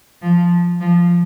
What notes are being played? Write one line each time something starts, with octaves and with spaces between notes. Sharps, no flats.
F3
F3